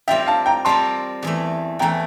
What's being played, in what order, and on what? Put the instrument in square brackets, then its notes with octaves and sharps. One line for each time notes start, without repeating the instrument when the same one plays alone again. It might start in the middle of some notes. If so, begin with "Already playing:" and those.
[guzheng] G3 C4 F4 A#4 [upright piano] E5 G5
[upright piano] F5 A5
G5 A#5
[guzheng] G3 C4 F4 A#4 [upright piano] A5 C6
[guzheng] E2 E3 A3
[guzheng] E2 E3 A3 [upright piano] G5 A#5